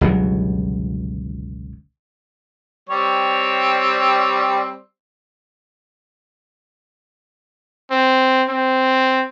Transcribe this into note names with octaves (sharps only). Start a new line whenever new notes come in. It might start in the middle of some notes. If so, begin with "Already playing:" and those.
G1 C#2 B2 F#3
G3 C4 C#5
C4
C4